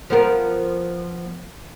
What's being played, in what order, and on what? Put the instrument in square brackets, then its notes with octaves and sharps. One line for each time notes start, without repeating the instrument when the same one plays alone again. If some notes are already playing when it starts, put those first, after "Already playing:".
[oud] F3 B3 A#4